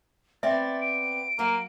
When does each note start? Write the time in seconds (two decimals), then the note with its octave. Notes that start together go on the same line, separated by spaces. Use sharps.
0.43 B3 C4 D5 E5 A6
0.81 D7
1.39 F#3 A#3